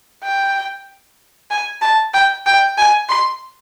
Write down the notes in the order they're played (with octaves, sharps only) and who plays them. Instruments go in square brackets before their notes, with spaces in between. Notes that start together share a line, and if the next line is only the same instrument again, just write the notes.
[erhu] G5
G#5
A5
G5
G5
G#5
C6